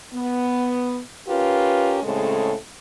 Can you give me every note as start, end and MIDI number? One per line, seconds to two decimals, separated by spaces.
0.13 0.98 59
1.28 1.99 61
1.28 1.99 65
1.28 1.99 67
1.28 1.99 70
1.28 1.99 71
2.03 2.54 45
2.03 2.54 49
2.03 2.54 56
2.03 2.54 60
2.03 2.54 69